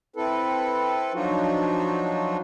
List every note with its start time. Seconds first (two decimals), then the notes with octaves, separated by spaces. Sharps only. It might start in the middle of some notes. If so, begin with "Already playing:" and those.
0.16 C4 E4 A4 B4
1.14 F3 F#3 D4 D#4 F4 F#4